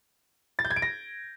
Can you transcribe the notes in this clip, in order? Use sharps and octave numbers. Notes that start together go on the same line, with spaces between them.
A6
G6
G#6
D7
A#6